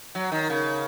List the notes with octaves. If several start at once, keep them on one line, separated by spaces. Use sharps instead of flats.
F#3
D#3
C#3